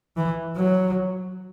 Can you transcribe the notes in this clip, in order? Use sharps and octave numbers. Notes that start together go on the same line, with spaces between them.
E3
F#3